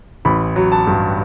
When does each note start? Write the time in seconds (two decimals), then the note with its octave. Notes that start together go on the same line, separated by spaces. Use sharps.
0.25 A1 B5
0.56 F#3
0.72 A5
0.87 G2